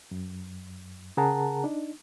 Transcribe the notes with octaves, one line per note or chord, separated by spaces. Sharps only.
F#2
C#3 G#4 A#4 F#5 A5 A#5
D4 D#4